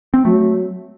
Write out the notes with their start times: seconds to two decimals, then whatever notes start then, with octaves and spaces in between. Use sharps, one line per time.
0.14 C4
0.25 F#3 A3